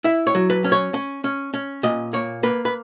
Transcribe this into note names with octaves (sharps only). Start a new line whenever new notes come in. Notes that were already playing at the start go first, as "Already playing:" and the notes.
E4 E5
C#5
F#3
B4
C#4
C#5
C#4
C#4
C#4
A#2 D#5
A#3 C#5
A#3 B4
B4